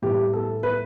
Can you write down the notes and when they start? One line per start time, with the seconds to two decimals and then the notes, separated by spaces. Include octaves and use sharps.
0.02 A2 E3 G3 G4
0.33 A4
0.63 B4